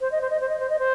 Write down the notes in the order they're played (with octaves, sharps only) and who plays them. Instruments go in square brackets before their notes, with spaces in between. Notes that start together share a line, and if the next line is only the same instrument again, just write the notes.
[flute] C5
D#5
C5
D#5
C5
D#5
C5
D#5
C5